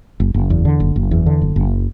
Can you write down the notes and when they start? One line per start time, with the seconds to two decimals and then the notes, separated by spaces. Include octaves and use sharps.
0.20 F#1
0.34 F#1
0.50 E2
0.65 D3
0.80 F#1
0.96 F#1
1.11 E2
1.26 D3
1.42 F#1
1.56 F#1